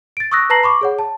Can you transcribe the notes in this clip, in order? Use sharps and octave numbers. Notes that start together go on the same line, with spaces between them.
A6 D7
C#6 D#6 E6 F#6 A#6
B4 A5 A#5 A#6 C7 F#7
B5 C#6 D6
G#4 C#5 F#5
A5